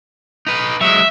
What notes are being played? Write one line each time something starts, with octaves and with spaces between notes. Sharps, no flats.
D#4 B4
F#3 G#3 E5